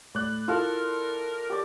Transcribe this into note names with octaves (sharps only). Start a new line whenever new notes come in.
A2 D5 F#6
E4 F4 A4 A#4 A5
G4 D5